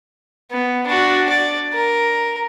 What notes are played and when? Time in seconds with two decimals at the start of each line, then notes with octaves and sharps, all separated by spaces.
0.51 B3
0.87 D4 F#4
1.29 D5
1.74 A#4